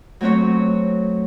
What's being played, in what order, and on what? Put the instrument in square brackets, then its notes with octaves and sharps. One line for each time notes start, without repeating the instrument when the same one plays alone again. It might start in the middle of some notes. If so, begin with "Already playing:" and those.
[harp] F#3 A3 C4 F#4 C#5